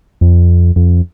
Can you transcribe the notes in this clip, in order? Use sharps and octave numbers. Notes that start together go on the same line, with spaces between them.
F2
F2